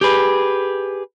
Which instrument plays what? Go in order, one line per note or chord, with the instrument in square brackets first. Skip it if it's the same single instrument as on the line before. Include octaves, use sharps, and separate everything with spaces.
[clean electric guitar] G4 G#4 B4